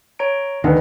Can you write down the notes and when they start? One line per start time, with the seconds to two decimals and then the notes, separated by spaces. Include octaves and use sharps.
0.19 C#5 A#5 D7
0.64 D2 D3 D#3 B4 D#5